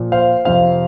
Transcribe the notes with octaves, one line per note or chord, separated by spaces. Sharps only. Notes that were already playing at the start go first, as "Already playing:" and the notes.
Already playing: A#2 F3
C5 F5
F2 C3 F3 C5 F5